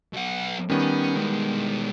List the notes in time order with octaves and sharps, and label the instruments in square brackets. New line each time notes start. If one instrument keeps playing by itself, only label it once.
[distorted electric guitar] B1 F#5
[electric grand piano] D#3 G3 B3 [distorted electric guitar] C#4
[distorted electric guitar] B2 G#3